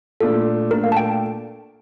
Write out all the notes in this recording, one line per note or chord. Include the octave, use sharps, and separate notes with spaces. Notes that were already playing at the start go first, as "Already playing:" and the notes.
A#2 A3 D4 F4 A4
A#2 A3 D4 A#4
F5
A5
G5